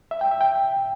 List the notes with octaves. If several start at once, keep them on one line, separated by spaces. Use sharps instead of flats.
E5
G5
E5
G5